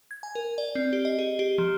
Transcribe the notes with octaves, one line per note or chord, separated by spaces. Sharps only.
G#6
G#5
A#4
D5
C4
G4
D#5
G#4
G4
F3